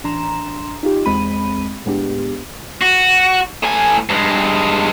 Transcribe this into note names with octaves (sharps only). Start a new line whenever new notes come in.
A1 D4 A#5 C6 E7
D#4 F4 G4
E2 G#3 C4 B5 D#7
A2 G#3 B3 D4 G4
F#4
A2 G#5
G2 G#3